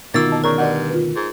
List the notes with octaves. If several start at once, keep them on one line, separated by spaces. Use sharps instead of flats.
D2 B2 D#3 A#3 F4 A#4 E6 A6
D#5 A5
C#3 A#4 D5 A#5 C#6
G2 D5 D#5 F#5
F4 B4
G#2